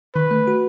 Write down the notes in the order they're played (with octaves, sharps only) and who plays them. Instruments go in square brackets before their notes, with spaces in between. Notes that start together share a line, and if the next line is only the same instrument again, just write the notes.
[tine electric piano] D#3 [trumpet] B4
[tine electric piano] A3
F#4